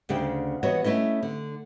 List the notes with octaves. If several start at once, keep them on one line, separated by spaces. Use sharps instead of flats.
D2 C#3 D4 G5
E3 B3 F#4 C#5 D#5
A3 C#4 E4 D#5
D3